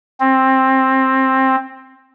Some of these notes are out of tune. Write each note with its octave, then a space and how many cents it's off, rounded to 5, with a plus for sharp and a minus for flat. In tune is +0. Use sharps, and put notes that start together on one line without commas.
C4 +15